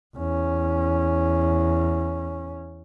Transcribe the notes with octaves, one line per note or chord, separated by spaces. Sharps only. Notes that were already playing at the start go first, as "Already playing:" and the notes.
E2 C#4